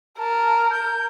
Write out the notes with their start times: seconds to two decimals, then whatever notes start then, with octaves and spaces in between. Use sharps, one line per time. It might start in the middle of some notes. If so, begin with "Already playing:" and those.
0.18 A#4 A5
0.71 G6